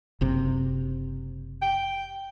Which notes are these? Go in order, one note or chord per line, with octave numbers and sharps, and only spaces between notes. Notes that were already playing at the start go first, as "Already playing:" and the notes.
F#1 C3
G5